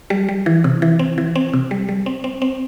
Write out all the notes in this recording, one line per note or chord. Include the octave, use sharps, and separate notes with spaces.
G3
G3
E3
C3
E3
C4
E3
C4
C3
G3
G3
C4
C4
C4